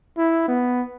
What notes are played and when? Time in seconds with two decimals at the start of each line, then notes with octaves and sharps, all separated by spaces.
0.18 E4
0.48 B3